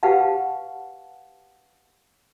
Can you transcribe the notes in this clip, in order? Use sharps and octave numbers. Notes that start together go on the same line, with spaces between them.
G4 B4 F5 F#5 A5